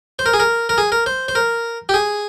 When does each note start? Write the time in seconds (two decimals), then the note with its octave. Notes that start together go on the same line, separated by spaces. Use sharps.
0.19 C5
0.26 A#4
0.34 G#4
0.40 A#4
0.69 A#4
0.78 G#4
0.92 A#4
1.06 C5
1.28 C5
1.35 A#4
1.89 G4
1.94 G#4